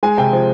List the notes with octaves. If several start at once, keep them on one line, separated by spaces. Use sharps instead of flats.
G#3 G#5
C3 G5
F3